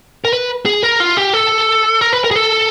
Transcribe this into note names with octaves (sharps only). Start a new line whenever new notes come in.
A#4
B4
G#4
A#4
F4
G4
A4
A#4
B4
A#4
G#4
A4